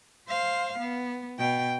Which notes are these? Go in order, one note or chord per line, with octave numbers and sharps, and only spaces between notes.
C5 F5
B3
B2 G5